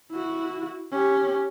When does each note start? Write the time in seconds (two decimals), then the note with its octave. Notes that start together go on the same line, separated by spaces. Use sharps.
0.11 E4 F#4
0.91 C#4 G4